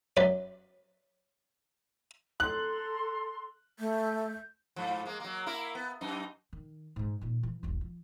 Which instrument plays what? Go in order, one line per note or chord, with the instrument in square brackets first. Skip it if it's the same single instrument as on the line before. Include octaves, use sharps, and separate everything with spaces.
[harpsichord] F#2 F#3 B4 D5
[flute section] A4 A#5 C6 [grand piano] F#6
[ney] A3 [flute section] G6
[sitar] G#2 F3
G#3 A#3
F#3 A#3
A#3 E4 A#4
B3
F#2 D#4
[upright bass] D#3
G#2 G#3
A#2 D#3
E3 F#3
E1 B1
F3